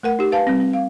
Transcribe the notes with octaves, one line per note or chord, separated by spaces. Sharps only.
A3 A#4 F#5
D#4 G4
B4 F5 G#5 A5
G3 C4
C4
F5